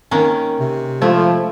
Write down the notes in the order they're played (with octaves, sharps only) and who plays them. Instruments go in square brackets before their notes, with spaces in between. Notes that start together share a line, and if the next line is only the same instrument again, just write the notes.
[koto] D#3 A#3 C#4 [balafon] C4 A#4
[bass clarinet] C3
[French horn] F3 [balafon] G#3 C5 [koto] A3 E4